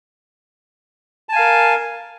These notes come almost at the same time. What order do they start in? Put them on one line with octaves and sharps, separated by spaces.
A5 G#5 F5 A#4